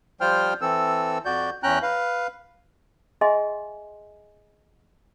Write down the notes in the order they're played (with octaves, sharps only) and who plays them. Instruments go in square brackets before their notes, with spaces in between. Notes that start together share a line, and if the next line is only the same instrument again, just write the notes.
[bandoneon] F3 G3 F4 C5 G5 F6
E3 C4 A4 E6
F2 F#4 D5 G6
E2 C#4 G5 A#5 F#6
B4 F5
[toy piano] G#4 D#5 E5 G#5 C6